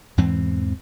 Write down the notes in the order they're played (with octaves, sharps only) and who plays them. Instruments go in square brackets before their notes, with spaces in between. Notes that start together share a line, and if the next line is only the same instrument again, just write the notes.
[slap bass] E2 G#2 E3 C4